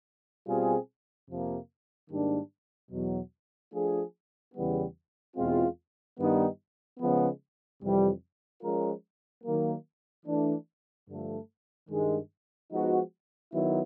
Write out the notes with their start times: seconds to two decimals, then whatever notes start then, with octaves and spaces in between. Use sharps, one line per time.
0.46 B2 G3 C4 F4 G#4
1.29 F2 C3 F3 A#3
2.10 G#2 D#3 G3 A#3 D4
2.92 E2 B2 F#3
3.73 F3 A3 D4 F4 G#4
4.55 E2 C#3 E3 G3 B3
5.37 E2 B2 G#3 C4 F4
6.18 G2 D#3 G3 B3 D#4
7.00 C#3 F3 G#3 B3
7.82 F2 C3 E3 G3
8.63 F3 G#3 C#4 F4 A#4
9.44 D#3 F#3 A#3
10.26 E3 A3 D4
11.08 G2 D3 F3 A3
11.90 G2 D#3 G#3
12.71 F3 G#3 B3 D#4 F#4
13.52 D#3 F#3 B3 E4